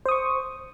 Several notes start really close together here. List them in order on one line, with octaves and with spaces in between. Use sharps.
C5 D#6 C#6